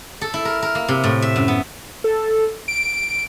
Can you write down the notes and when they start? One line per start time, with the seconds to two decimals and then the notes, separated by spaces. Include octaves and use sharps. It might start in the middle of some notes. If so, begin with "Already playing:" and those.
0.21 A4
0.34 E4
0.45 A#4
0.62 A#4
0.75 A#3
0.88 C3
1.04 A2
1.22 E5
1.36 F#2
1.48 B3
2.04 A4
2.68 D7